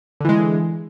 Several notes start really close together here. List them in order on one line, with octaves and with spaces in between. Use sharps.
D3 E3 G#3